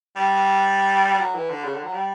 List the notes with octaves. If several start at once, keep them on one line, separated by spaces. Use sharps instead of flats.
G3
G3
F#3
E3
D3
C#3
D3
F#3
G3